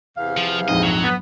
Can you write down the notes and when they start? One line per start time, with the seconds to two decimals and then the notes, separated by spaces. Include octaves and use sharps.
0.16 E2 C3 F5
0.37 F3
0.68 A#1 F2 G#2 D#5
0.83 F#3
1.04 B3